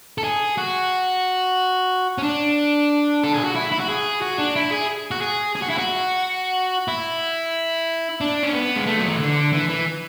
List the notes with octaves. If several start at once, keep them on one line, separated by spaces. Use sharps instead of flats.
A4
G#4
F#4
C#4
D4
A4
G#4
F#4
E4
E4
F#4
G#4
F#4
D4
E4
G#4
F#4
G#4
G#4
F#4
E4
F#4
E4
D4
C#4
B3
G#3
A3
F#3
E3
D3
E3
E3